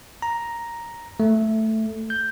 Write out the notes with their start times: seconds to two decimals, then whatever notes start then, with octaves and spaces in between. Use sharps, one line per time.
0.22 A#5
1.20 A3
2.10 G6